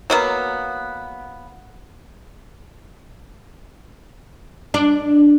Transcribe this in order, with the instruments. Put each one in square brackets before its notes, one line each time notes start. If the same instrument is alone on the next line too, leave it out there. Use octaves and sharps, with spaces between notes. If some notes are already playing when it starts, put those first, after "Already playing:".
[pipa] F#3 A#3 B3
[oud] D4